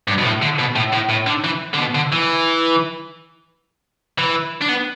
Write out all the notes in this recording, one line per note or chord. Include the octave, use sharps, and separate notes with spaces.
G2
B2
A2
D3
B2
A2
A2
A2
D3
E3
D3
B2
D3
E3
E3
D4
B3